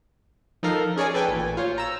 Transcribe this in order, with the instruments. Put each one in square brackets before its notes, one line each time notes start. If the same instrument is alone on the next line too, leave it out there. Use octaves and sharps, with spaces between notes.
[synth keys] F3 D#4 A4 A#4 F5
C#4 G#4 C#5 D5 G#5
A4 B4 G5 G#5
A1 A#2
F4 C5 C#5
A#5 E6